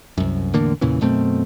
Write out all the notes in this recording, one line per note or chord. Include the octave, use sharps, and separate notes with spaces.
C2 F#2
E2 A2 D3 A#3
E2 A#2 C#3 E3
F#2 B2 A3 C4